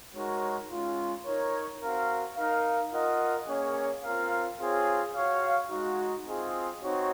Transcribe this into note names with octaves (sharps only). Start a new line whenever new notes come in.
G#3 D#4 F#4 A#4 C#5
G#3 C#4 F4
D#4 A#4 C#5
C4 F#4 A#4 F5
D#4 A#4 F5
F4 A#4 D#5 F#5
A#3 C#4 G#4 C#5
C4 F4 A#4 F5
C4 F4 G#4 C#5
F#4 C#5 F5
G#3 D#4 F#4
C4 F4 G#4 D#5
C4 D#4 F#4 C#5